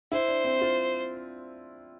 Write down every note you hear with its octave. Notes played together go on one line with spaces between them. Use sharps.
E4 C5
D4
C4
F4